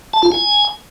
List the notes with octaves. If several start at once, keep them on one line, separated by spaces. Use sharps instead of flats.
A5
F4
G#5